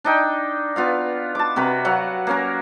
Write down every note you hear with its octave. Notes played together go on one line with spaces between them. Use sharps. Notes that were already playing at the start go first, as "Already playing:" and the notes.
D4 D#4 G5
B3 F4 F5
A5 D6
C3 F#4 A#4 B4
F#3 F5 F#5
A#3 C#4 A#4